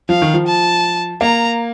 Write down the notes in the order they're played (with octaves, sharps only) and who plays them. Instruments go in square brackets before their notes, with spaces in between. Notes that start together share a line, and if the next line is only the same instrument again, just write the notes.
[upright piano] F3 [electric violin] F5
[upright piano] D#3
F3
[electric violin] A5
[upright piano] A#3 [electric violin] A#5